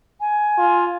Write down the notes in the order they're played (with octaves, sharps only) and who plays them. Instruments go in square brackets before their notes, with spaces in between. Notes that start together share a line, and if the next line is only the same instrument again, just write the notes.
[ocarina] G#5
[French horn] F4